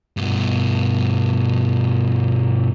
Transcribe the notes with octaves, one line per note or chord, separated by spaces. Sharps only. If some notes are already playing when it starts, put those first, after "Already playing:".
G2 B2